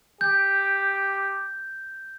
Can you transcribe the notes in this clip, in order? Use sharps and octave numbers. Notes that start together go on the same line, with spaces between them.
G4 G6